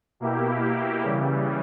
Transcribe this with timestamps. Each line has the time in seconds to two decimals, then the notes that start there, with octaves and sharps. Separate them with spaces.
0.20 B2 A#3 E4 G4
1.02 C#3 E3 G3